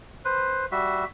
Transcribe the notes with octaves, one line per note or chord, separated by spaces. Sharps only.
B4 C5
G3 F#4 E5